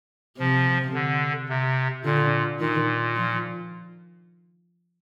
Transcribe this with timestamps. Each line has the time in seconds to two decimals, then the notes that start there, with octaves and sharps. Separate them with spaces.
0.38 C3 F3
0.94 D3
1.49 C3
2.05 A#2 D3
2.60 A#2 D#3
3.16 F3